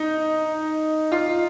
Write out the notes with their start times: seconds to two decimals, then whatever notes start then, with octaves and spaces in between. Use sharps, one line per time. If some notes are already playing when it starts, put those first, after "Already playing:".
Already playing: D#4
1.12 F4